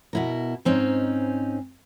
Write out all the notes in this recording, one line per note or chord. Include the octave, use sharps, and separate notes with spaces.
B2 E4 A#4
G#2 C4 C#4 D#4